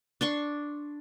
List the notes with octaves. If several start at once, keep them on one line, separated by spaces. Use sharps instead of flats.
D4 C6 C#6